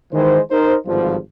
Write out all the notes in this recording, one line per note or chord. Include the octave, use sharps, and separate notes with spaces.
D#3 E3 G#3 C5
D#4 A#4 C5
G#1 G2 D3 F3